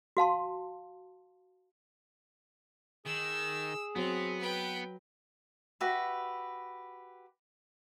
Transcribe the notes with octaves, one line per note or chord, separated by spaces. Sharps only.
F#4 F5 A5 C6
D#3 G#4 E6
F#3 B3 C4
B4 G5
F#4 G4 B4 E5